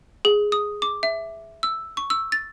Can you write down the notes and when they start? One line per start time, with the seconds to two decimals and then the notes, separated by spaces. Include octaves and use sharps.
0.25 G#4
0.52 D#6
0.82 D6
1.03 E5
1.63 E6
1.97 C#6
2.10 E6
2.32 A6